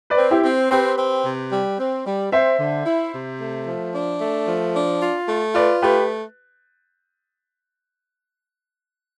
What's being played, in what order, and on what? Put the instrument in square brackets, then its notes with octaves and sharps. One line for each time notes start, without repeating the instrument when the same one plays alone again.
[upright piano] B4 D5
[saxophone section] C4
[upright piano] E4 G4
[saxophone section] C4
[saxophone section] C4 [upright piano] G4 B4
[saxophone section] C4
C3
G3
C4
G3
[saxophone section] C4 [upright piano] C5 E5
[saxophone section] D3
E4
C3
A3
F3
D4
A3
F3
D4
F4
A3
[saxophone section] F4 [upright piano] B4 D5
[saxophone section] A3 [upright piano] G4 B4